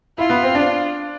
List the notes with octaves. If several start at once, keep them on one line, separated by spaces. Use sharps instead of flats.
E4 F4
B3
C4
D4